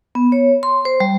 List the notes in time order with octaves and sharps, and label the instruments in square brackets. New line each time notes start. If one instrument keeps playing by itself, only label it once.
[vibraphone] B3
C#5
C6
C5
G3